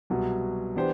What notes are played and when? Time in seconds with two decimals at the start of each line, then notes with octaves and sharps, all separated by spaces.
0.10 C2 B2 F#3
0.76 E3 B3 D4 G4 C5